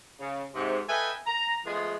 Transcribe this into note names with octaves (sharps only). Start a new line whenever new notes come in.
C#3
G#2 C3
A4 B4 D#5 E5 G5 G#5
A#5
F3 G#3 A3 B3 F4 G#4